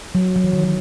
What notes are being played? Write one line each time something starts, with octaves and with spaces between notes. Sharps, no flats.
F#3
F#3
E3
D#3
F#3